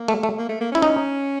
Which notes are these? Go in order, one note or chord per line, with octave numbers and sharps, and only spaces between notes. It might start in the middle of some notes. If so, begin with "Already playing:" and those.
Already playing: A#3
A3
A3
A#3
A3
A#3
C#4 E4
D#4